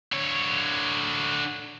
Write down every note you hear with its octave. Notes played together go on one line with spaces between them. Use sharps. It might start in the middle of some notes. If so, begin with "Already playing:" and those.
D3 C#5